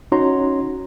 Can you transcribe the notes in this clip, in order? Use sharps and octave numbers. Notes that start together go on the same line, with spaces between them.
C#4 D#4 F#4 C#5 A#5 C6